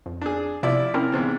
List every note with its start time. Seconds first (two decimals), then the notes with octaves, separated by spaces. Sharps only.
0.06 F2
0.21 D4 G#4
0.63 C3 F3 E4 D5
0.94 C4 C#4 E4 A#4
1.12 E2 G#2 C3